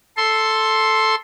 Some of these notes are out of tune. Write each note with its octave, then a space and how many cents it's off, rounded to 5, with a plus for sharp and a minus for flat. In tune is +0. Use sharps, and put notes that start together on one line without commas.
A4 +0 C6 +10